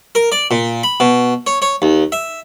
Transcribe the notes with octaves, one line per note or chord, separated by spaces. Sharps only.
A#4
D5
A#2
B5
B2
C#5
C#5
D#2
E5